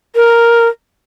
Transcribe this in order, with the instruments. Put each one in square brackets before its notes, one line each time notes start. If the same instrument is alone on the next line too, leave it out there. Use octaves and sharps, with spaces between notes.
[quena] A#4